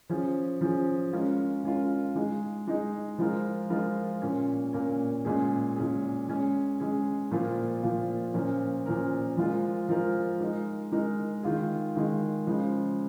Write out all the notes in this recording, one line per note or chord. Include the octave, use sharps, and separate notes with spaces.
F3 C#4 G#4
F3 C#4 G#4
G#3 C#4 F4 A#4
G#3 C#4 F4 A#4
G#3 D#4 G#4
G#3 D#4 G#4
F3 G#3 F4 A#4
F3 G#3 F4 A#4
A#2 A#3 C#4
A#2 A#3 C#4
A#2 G#3 C#4 G#4
A#2 G#3 C#4 G#4
G#3 C#4 G#4
G#3 C#4 G#4
A#2 F3 A#3 F4
A#2 F3 A#3 F4
A#2 F3 C#4 A#4
A#2 F3 C#4 A#4
F3 G#3 F4 A#4
F3 G#3 F4 A#4
G#3 D#4 A#4
G#3 D#4 A#4
D#3 G#3 F4 G#4
D#3 G#3 F4 G#4
C#3 F3 G#3